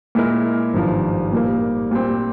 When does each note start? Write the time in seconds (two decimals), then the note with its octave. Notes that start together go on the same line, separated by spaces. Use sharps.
0.15 A#2 G#3 E4 A#4
0.74 G#1 G2 F3
1.32 A#2 G3 A#3
1.91 A#2 G3 C4